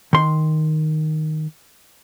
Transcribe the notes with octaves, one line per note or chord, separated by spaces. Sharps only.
D#3 C6